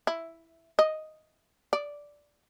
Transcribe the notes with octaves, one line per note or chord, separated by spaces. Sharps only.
E4
D#5
D5